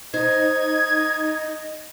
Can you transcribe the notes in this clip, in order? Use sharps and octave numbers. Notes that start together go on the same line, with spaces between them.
D#4 C5 D#5 G#6